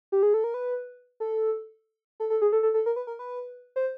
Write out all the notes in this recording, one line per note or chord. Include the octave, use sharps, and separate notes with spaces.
G4
G#4
A4
A#4
B4
A4
A4
A4
G#4
A4
A4
A4
A#4
B4
A#4
B4
C5